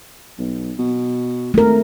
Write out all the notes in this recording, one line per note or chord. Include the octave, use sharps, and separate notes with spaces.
B1
B2
G#1 A3 A#4